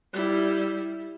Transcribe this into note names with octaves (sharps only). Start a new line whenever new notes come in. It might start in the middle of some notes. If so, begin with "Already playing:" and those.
G3 E4